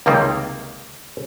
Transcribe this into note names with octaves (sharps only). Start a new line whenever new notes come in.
C#2 C3 D#3 G3 A#3